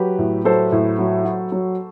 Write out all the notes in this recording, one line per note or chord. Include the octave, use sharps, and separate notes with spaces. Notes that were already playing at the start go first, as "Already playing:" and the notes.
Already playing: F#3 G4 B4
A2
F#3 A4 C5
A2
F#3
F#4
F#3